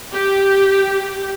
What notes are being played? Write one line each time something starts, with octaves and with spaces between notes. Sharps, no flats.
G4